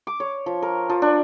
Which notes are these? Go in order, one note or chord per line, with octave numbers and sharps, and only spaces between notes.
D6
C#5
F3
A#4
F3
D4